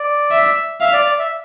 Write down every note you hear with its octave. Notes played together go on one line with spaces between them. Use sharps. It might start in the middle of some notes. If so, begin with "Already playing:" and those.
Already playing: D5
E5
E5 F5
D5
D5
E5